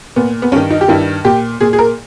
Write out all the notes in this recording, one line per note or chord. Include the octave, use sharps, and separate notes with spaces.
A#2 B3
B3
G2 D#3 C#4
D#4
G4
G2 D#3 E4
A#2 G4
A#2 G#4
G#4
A#4